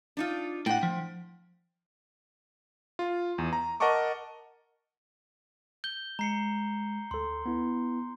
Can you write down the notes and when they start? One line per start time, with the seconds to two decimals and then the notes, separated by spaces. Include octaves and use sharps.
0.17 D4 D#4 F4
0.66 A2 F#5 G5
0.83 F3
2.99 F4
3.38 E2
3.53 A#5
3.80 A#4 D#5 F#5 A5 C#6 D6
5.84 G6 G7
6.19 G#3 A#5 C7 C#7
7.11 D2 A4 C6
7.46 B3 E4